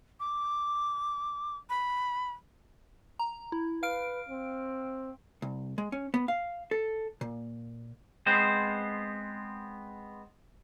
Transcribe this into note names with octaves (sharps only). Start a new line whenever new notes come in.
D6
B5
A#5
E4
B4 F5 F6 D7
C4
C2
G#3
C#4
B3
F5
A4
A#2
G#3 B3 C4 C5